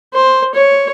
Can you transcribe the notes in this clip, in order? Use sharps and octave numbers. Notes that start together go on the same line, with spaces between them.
C5
C#5